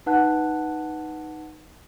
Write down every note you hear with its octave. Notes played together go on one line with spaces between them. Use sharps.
D#4 B4 F#5 A5 F#6